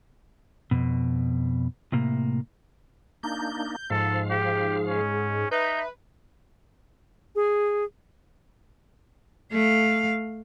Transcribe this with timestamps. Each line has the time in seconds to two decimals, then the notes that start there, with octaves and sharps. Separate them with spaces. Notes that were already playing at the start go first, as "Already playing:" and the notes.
0.71 F2 B2
1.92 A2 C3 A#3
3.23 A#3 D4 D#4 G6
3.90 G#2 F3 A4 F5
4.30 G4 G#4
4.87 C#4
5.51 D#4 B4 E5 G6
7.35 G#4
9.52 A3 F5